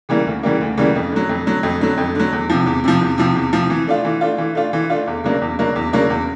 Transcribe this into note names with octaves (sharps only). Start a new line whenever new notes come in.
C#3 E3 G3 A#3
D2
C#3 E3 G3 A#3
D2
C#3 E3 G3 A#3
F2
D3 F#3
F2
D3 F#3
F2
D3 F#3
F2
D3 F#3
E2
C3 F3
E2
C3 F3
E2
C3 F3
E2
C3 F3
E3
A3 D4 F4
E3
A3 D4 F4
E3
A3 D4 F4
E3
A3 D4 F4
E2
C#3 F#3 A#3 D4
E2
C#3 F#3 A#3 D4
E2
C#3 F#3 A#3 D4
E2